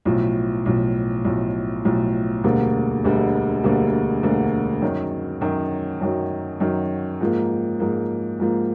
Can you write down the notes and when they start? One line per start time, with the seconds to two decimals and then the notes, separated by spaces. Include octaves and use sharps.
0.05 B1 A2 F3
0.66 B1 A2 F3
1.24 B1 A2 F3
1.85 B1 A2 F3
2.44 E1 D2 D3 G3 A#3
3.04 E1 D2 D3 G3 A#3
3.64 E1 D2 D3 G3 A#3
4.23 E1 D2 D3 G3 A#3
4.82 F#2 D#3 F#3
5.41 F#2 D#3 F#3
6.01 F#2 D#3 F#3
6.60 F#2 D#3 F#3
7.21 G#2 F3 A#3
7.80 G#2 F3 A#3
8.40 G#2 F3 A#3